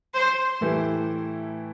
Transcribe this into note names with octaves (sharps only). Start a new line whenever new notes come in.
C5
A2 E3 A3 E4 G4